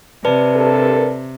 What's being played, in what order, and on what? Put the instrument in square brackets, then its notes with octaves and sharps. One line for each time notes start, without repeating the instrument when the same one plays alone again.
[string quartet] C3 [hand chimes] B4 D5 A5
[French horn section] G2 A4 A#4